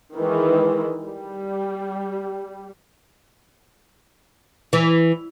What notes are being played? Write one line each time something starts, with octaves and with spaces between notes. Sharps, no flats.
D#3 E3 G#3
G3
E3